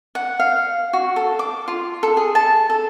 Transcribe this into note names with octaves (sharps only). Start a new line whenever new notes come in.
F#5
F5
F#4
A4
D6
F4
A4
G#4
A5
A4